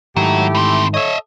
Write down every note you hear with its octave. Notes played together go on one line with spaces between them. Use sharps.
G#2 D#3 F#3 A3 E4 G4
E3 C4
A4 C#5 D#5 E5